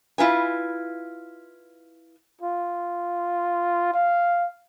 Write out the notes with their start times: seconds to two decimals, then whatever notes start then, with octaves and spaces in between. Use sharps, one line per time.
0.18 E4 F4 B4 G#5
2.41 F4
3.94 F5